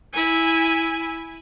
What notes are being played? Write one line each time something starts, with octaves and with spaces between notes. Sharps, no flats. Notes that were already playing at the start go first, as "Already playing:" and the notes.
E4 G#5